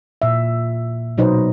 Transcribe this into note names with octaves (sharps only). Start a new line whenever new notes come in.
A#2 E5
B2 F#3 D#4 B4 C5 D#5